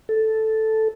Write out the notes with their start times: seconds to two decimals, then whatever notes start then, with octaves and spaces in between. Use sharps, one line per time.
0.09 A4